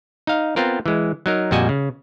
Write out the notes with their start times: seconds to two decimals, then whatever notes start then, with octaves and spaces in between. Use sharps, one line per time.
0.27 D#4 F5
0.56 B3 C4 F4 A#4
0.86 E3 G#3
1.26 F#3 D#4 A#4
1.51 F2 A#2 G3 F#4 D#5 G#5
1.69 C#3